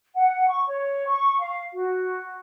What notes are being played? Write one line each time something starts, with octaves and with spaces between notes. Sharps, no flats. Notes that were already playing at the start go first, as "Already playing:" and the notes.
F#5
C#6
C#5
C#6
F5
F#4